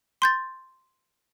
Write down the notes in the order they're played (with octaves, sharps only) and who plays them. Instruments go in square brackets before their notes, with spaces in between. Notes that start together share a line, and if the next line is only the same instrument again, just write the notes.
[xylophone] C6 G6 A6